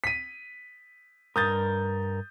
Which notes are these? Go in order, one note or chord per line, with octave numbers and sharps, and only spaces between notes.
B6 D#7
G2 A#4 D#6 G6 A6